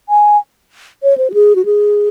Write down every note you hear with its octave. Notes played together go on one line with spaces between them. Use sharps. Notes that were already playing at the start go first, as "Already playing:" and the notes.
G#5
C#5
C5
F#4
G#4
F#4
G#4